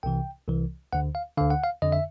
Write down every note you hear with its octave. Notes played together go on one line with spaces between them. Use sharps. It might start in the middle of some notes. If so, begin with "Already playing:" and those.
C2 C3 E3 G5
C2 C3 E3
D2 D3 F#5
F5
D2 D3 F5
F#5
F5
F2 D3 D#5
E5